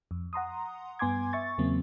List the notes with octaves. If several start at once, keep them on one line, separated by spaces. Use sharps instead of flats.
F2
F#5 A#5 C6 D#6
G2 B3 G#5 C6 D6 G#6
E5 C#6 A6
E2 C#3 F#3 A#3 C4